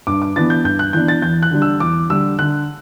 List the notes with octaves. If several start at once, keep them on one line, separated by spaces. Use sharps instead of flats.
G2 D6
D6
E3 B3 D4 A6
G6
G2 G6
F#6
E3 B3 D4 G6
A6
E2 G6
F#6
D3 G3 D4
E6
E2 D6
D3 G3 D4 E6
D3 F#6